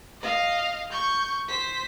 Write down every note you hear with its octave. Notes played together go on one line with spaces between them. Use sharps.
D#5 F5
C#6 G6
C5 B6